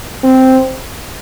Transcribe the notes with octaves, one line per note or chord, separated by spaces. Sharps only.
C4